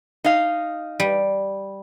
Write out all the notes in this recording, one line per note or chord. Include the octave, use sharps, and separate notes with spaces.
D#4 F5
G3